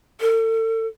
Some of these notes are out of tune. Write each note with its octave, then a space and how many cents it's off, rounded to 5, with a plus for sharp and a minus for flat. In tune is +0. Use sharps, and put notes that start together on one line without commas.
A4 +40